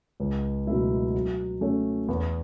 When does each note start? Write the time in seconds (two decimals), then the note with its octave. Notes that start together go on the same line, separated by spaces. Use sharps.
0.20 C#2
0.67 B2 F#3 A3 E4
1.14 F#3
1.61 A3 C#4
2.08 E2